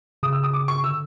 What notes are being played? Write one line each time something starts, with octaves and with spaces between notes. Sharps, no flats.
C#3 D#6
E6
D#6
D6
C#6
D3 E6